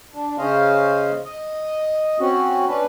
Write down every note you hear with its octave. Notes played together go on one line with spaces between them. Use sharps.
D4
C#3 C#4 C5 D#5 F5
D#5
C4 C#4 F#4
C#4 D4 B4